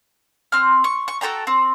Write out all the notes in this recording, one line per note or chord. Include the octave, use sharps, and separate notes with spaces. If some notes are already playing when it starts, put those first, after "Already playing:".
C4 F6
C#6
C#6
F#4 A4 G5 A#5
C4